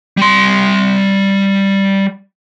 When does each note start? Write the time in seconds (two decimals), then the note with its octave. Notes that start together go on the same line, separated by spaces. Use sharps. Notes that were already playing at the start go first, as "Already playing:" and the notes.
0.17 G3 C6